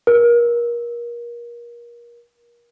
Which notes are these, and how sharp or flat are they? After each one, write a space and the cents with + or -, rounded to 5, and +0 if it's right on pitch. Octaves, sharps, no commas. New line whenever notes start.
A#4 +30